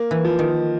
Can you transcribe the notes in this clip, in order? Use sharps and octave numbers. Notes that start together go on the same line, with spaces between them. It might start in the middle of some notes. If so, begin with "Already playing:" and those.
Already playing: A#3
E3
F3
D#3